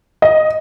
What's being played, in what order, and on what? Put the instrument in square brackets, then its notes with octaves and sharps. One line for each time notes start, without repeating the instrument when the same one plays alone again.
[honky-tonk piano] D#5